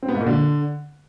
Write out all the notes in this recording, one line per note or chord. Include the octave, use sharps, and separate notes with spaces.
C4
B3
G#2
A#2
D3